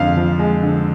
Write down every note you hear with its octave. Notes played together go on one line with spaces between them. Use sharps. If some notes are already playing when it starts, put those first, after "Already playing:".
Already playing: F2 D3 G#3 F5
F3
G#3
D3